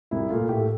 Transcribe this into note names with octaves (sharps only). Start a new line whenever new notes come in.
C2 E4
A#2 A3 F4
A2 G4
A4